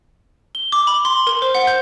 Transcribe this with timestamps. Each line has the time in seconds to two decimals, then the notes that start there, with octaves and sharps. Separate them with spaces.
0.55 G7
0.72 D6
0.87 B5
1.05 C6
1.27 A#4
1.42 C5
1.55 F#5
1.67 G6